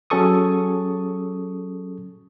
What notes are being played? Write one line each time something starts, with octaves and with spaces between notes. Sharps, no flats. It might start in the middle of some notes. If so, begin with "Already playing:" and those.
F#3 C#4 G#4 A4 C#6 D#6